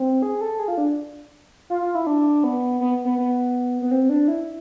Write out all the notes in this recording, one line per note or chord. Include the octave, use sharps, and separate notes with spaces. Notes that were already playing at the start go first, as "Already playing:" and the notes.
Already playing: C4
G#4
A4
G#4
F4
D4
F4
F4
E4
D4
B3
B3
B3
B3
B3
C4
D4
E4